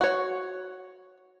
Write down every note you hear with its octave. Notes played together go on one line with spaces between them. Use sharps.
F#4 C#5